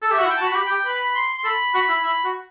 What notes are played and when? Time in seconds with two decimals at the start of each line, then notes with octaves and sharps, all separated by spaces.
0.02 A4
0.11 G4 E5
0.19 F#4 F#5
0.25 E4
0.29 G5
0.37 A5
0.41 F#4
0.46 B5
0.52 F#4
0.55 G4
0.66 G4 G5
0.85 B4 B5
1.15 C6
1.37 C6
1.44 A4 B5
1.74 F#4 B5
1.89 E4
2.04 E4 B5
2.24 F#4